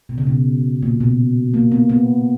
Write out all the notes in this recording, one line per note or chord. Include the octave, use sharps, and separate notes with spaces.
B2
C#3
B2
A#2
B2
A#3
B3
B3